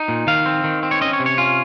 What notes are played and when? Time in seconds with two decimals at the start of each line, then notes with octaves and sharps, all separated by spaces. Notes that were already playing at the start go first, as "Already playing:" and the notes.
Already playing: D#4
0.08 A#2
0.27 D#3 F5
0.46 C4
0.64 D#3
0.83 C4
0.91 C#5
1.01 C#4 D#5
1.13 C#5
1.20 C3
1.26 C#5
1.38 C#4 F4